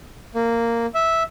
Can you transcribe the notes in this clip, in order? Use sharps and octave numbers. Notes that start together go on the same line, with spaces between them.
A#3
E5